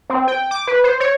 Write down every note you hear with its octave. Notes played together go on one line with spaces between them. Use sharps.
C4
G5
D6
B4
C5
C#5